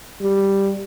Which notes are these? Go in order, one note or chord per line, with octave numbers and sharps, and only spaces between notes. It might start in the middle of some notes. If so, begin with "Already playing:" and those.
G3